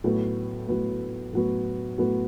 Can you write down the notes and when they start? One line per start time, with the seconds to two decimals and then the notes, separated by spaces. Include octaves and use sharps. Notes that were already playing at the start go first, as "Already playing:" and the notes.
0.04 A2 F#3 B3
0.68 A2 F#3 B3
1.33 A2 F#3 B3
1.98 A2 F#3 B3